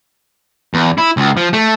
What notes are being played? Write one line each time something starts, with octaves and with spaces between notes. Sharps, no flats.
E2
E4
C#2
F3
A3